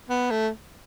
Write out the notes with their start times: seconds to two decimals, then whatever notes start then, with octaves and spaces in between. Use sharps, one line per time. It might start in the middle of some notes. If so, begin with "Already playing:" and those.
0.10 B3
0.31 A3